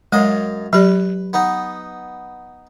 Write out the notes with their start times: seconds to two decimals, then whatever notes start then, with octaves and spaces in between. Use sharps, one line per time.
0.12 F#2 G#3 D#5 F5
0.73 F#3 G4 B4 D5
1.33 B3 D#4